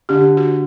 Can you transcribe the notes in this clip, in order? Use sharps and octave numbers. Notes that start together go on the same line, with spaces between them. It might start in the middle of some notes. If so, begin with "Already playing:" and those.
D3 G4
F#4